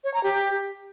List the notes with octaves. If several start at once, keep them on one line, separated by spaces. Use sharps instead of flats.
C#5
A#5
G4